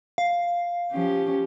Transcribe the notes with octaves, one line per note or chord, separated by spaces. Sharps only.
F5
F3 C#4 G4